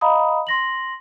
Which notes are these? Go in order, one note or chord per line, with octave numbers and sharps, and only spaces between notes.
D#5 F5 A#5 B5 D#6
C6 A#6 F#7